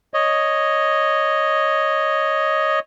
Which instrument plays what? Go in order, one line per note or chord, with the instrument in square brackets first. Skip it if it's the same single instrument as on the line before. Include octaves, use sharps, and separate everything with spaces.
[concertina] C#5 D#5